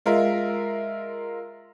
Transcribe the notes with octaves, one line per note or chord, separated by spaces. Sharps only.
G#3 F4 A#4 E5